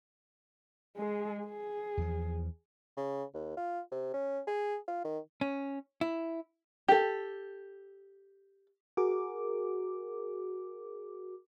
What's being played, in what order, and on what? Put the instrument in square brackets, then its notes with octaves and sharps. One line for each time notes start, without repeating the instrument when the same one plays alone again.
[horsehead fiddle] G#3 G#4
G#4
[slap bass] E2 E3 F3
[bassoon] C#3
D#2
F4
C3
C#4
G#4
F4
D#3
[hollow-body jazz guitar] C#4
E4
[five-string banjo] G4 A4
[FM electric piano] F#4 G#4 A#4 D6